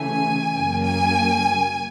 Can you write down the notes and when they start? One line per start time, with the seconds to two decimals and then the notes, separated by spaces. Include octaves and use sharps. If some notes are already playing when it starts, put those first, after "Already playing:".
Already playing: C#3 E3 A3 G#5
0.53 F#2 C#3 F#3 A#3
0.84 G#5